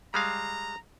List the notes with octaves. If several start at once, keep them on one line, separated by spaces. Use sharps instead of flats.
G3 G#3 F5 A#5